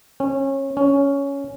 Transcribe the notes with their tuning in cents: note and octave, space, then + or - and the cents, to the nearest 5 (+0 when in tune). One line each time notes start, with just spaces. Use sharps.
C#4 -25
C#4 +10